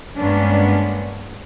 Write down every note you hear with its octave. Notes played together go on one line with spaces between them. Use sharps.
G2 G#3 A#3 B3 C#4 D4